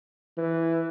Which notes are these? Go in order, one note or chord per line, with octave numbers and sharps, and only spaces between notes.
E3